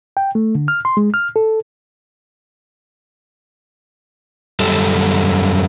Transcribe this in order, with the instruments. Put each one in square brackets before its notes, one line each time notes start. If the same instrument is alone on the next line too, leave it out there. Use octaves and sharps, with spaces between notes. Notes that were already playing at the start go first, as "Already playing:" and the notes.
[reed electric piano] G5
A3
D3
F6
C6
G#3
F6
A4
[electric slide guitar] F#2 G3 G4 A4